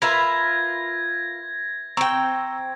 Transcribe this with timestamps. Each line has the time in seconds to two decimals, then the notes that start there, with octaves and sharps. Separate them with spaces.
0.02 F4 A#4 B4 E5 B5 G#6 A#6
1.97 C4 G5 A#5 C#6 E6